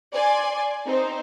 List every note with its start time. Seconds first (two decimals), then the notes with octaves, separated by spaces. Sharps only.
0.13 D5 G#5 C6
0.87 C4 D#4 C5